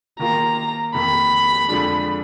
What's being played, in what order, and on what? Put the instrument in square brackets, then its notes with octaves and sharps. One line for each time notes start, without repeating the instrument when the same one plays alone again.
[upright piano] D#3 A#3 F4 [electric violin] A#5
[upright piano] F2 D#3 A#3 [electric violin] B5
[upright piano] F2 D3 F3 G#3 D4